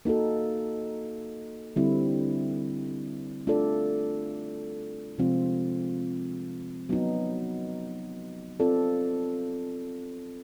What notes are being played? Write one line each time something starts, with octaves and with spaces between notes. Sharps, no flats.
A#3 D#4 F#4 A4
D3 G3 C4 E4
A3 D4 F4 A4 D5
C3 F3 G#3 C4 F4
F#3 B3 D#4
C4 F4 A4 D5